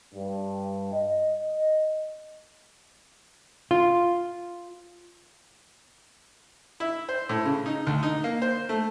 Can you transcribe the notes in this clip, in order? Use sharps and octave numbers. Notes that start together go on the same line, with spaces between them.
G2
D#5
F4
E4
C5
A2
C#3
D#4
D2
D#4
A#3
C5
A3